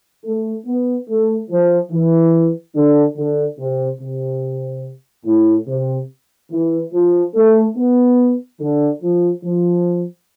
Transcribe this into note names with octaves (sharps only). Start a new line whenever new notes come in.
A3
B3
A3
F3
E3
D3
D3
C3
C3
A2
C3
E3
F3
A3
B3
D3
F3
F3